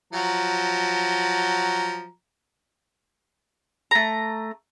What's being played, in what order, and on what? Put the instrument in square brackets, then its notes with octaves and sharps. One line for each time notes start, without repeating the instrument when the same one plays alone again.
[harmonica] F3 F#3 A#5
[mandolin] A3 A#5